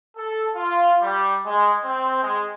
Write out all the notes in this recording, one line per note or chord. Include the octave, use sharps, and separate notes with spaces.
A4
F4
G3
G#3
C4
G#3